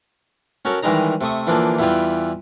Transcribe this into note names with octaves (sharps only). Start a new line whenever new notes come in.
C#4 F#4 A4 A#4
D#3 E3 G3 G#3 D#4 A#5
C3 A3 C#6 D#6
D3 E3 F3 A#3 D4
E2 E3 G3 E4 F4 G5